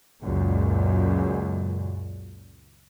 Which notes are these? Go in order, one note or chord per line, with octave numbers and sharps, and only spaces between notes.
C#2 F#2 A#2